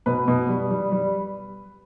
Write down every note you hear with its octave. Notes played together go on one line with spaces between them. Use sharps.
B2 B4
B2
G3
G3
G3